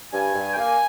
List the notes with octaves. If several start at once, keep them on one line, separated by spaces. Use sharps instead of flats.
G2 G#5
G2
G5
A#3 G#5